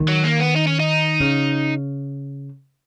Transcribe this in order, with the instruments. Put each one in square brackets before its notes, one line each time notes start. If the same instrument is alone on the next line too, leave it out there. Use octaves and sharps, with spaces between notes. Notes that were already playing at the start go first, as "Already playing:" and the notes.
Already playing: [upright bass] D#3
[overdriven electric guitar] F#3
A#3
B3
D#4
C#4
D#4
[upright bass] C#3